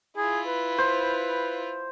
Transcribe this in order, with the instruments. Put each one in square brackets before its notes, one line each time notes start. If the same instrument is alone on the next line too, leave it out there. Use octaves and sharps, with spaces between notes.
[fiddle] E4 F4 [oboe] G#4
[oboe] B4
[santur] C5